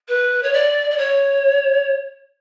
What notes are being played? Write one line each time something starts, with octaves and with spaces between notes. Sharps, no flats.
B4
C#5
D5
D5
C#5